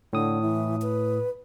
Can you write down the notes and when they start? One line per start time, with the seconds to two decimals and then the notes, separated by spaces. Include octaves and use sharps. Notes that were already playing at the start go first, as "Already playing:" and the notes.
0.13 A2 D3 D#6
0.42 E3
0.82 B4